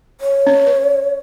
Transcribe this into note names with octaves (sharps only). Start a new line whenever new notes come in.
C#5
C#4
B4